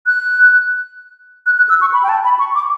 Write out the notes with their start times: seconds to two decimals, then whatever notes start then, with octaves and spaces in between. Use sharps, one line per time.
0.06 F#6
1.46 F#6
1.57 F#6
1.69 E6
1.81 C#6
1.93 B5
2.03 G5
2.09 A5
2.25 B5
2.39 C#6
2.55 D6